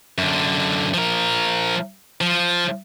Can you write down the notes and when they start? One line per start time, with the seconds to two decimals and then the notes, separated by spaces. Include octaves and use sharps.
0.18 F#2 D3
0.94 F3 A#4
2.21 F3